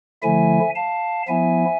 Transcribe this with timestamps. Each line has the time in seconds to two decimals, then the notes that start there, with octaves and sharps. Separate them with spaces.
0.22 D3 F3 A3 E4 E5 G#5
0.75 F5 A5
1.28 F3 B3 E4 E5 G#5